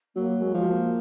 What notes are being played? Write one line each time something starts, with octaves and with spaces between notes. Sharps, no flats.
F#3 A#3
G#3
F3
A#3